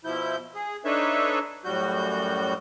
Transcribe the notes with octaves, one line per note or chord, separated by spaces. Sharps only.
B2 F3 E4 G6
G#4
D4 D#4 A4 B4 C#5 E5
F#2 A2 G3 F#4 G6